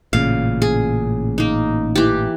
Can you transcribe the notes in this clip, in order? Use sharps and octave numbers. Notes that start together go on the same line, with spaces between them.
A1 A#2 C#3 F5
G#4
A#3 D#4
E3 G4